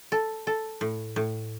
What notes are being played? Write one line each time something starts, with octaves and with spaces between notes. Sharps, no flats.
A4
A4
A2
A2